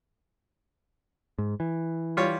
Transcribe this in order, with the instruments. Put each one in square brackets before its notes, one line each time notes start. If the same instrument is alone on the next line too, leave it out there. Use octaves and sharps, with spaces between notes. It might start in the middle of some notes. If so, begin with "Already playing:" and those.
[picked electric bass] G#2
E3
[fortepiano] G3 F4 C#5